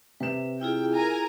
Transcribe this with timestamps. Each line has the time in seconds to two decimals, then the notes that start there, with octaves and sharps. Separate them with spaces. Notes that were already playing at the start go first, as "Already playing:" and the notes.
0.20 C3 B4 E7
0.61 E4 F4 G#4 G5
0.95 A#4 G#5 A#5